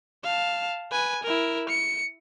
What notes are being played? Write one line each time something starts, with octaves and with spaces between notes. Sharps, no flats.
F5 A5
B4 G#5
E4 A#4
C#7